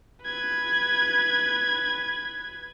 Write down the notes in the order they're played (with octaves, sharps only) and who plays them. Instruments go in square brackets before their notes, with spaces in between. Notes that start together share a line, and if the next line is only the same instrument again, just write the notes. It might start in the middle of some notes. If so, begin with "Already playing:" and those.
[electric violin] B4 G#6